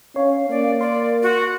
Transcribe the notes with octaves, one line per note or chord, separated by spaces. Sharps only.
C#4 C#5 F5
A#3 D5
A#4 D5 C6
F#4